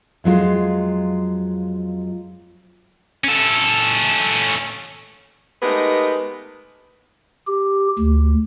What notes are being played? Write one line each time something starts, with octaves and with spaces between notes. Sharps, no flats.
F2 F#3 G#3 F4
C#4 A4
G#3 A3 B3 D#4 G4 A#4
G4
D2